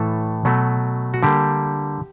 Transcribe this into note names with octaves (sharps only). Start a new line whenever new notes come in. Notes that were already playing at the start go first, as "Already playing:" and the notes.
Already playing: A2 E3 A3 A4
B2 F#3 A3
F#4
D3 G3 A#3 G4